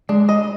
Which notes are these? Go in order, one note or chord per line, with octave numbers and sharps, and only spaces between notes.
G#3 D4
D#5